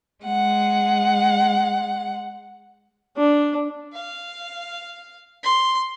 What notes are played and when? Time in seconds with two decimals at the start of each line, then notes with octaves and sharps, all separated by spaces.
0.23 G#3 F#5
3.17 D4
3.93 F5
5.43 C6